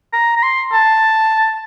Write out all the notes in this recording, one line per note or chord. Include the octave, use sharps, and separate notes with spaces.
A#5
A#5
C6
A5